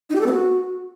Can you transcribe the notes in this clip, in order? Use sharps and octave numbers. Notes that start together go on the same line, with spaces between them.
D#4
G4
A4
B3
F#4